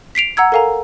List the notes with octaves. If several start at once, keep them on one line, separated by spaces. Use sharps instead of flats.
B6 C7 D7 F7
F#5 A#5 E6 G#6
A4 A#4 F5 G#5 A#5